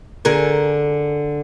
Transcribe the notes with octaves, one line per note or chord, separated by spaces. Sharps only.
D3 G#4 A#4